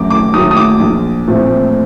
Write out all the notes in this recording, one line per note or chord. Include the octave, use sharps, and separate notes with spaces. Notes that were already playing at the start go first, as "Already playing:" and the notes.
Already playing: F#2 D#3 F#3 A3 D6
D6
D#3 F#3 A3 D#6
D#6
D6
A#1
A#2 A3 C4